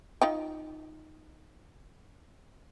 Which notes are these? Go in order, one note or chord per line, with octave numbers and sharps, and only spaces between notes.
D#4 F4 G5